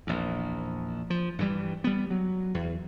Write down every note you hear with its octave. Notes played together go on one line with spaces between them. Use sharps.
A#1 E2
F3
G2 E3 G3
G3 B3
F#3
E2